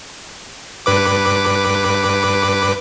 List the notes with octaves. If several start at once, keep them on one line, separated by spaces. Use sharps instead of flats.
G2 B4 D6